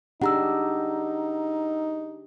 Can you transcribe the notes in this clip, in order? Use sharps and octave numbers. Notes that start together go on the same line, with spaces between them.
D4 D#4 G4 G#4 F#5 A#5 E6